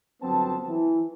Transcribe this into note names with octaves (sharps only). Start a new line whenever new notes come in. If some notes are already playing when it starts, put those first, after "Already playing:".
G1 F#3 B3 C4 A5
E3